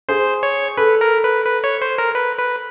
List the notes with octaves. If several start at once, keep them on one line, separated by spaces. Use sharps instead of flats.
G#4 C5
C#5
A4 B4
A#4
B4
B4
C#5
C5
A#4
B4
B4